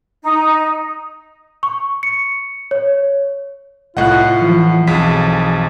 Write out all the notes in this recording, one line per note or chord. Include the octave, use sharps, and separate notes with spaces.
D#4
C#6
C#7
C#5
C2 A2 F4 D#5 F#5 F#6
E3 F3
B1 F2 G#4 B6